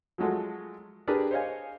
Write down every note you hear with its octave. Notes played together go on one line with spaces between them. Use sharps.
F3 F#3 G#3 A3 F#4
D4 G4 G#4 A#4 B4 D5
C5 C#5 D#5 F5 G#5